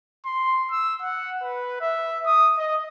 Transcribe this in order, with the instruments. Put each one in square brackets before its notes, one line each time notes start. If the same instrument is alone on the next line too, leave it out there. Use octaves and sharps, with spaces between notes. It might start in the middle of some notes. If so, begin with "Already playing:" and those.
[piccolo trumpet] C6
E6
F#5
B4
E5
D#6
D#5